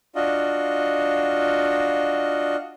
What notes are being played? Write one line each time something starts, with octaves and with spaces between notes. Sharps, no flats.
D4 F4 F#4 D#5